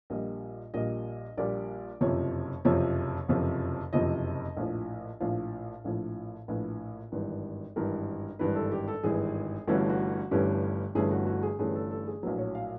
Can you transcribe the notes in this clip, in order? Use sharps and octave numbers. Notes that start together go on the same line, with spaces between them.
A#1 A#2 G3 D#5
A#1 A#2 G3 D#5
A#1 A#2 G3 D5
F#1 F2 C3 F3 C#5
F#1 F2 C3 F3 C#5
F#1 F2 C3 F3
F#1 F2 C3 F3 D#5
A#1 A2 F3
A#1 A2 F3 F5
A#1 A2 F3
A#1 A2 F3 B4
G#1 G2 E3
G#1 G2 E3 A#4
G#1 G2 E3 B4
A4
G4
A4
G#1 G2 E3 G#4
G1 G2 E3 A3 C#4 F#4
F#4
G1 G2 E3 A3 C#4 G4
G1 G2 E3 A3 C#4 G#4
F#4
F#4
G#4
G1 G2 E3 A3 C#4 G#4
A4
A4
G#4
A#1 A2 F#3 B4
C#5
F5